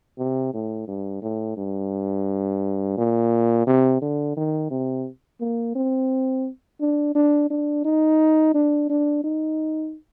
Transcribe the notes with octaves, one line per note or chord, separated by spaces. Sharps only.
C3
A2
G2
A2
G2
A#2
C3
D3
D#3
C3
A#3
C4
D4
D4
D4
D#4
D4
D4
D#4